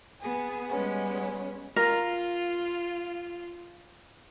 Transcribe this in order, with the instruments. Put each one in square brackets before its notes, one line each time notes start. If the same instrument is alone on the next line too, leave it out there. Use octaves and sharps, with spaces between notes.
[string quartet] B3 G#4
G3 G#3 B3 C#4
[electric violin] F4 [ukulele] A#4